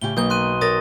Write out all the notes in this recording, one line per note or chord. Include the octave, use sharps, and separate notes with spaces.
A2 C#3 G4 G7
B1 A#3 D#6 G6 G7
C6 F#6 D#7
A4 A#4 C#5 D#6 A6 A#6